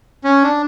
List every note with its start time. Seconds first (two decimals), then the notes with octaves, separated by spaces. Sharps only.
0.24 C#4
0.43 D4